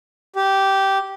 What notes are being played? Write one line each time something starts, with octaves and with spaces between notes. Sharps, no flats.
G4